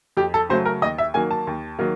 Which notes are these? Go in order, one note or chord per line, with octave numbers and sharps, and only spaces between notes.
F2 G4
A4
C#3 F#3 A3 C5
A#4
D#2 D#5
E5
D#3 F#3 A#3 G#5
A5
D#2
D#3 F#3 A#3